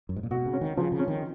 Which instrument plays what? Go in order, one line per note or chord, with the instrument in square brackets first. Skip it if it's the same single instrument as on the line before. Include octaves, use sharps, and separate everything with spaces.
[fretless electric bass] F#2
G#2
A#2
[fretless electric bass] B2 [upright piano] F#4
[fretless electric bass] C#3
[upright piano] C#4
[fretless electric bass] D#3
[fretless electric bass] C#3 [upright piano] F3
[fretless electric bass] C#3
[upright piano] C#4
[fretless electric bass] D#3